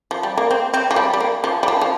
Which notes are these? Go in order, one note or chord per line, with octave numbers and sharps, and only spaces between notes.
F3
G3
A#3
C4
C4
F3
G3
G3
A#3
F3
G3
F3
F3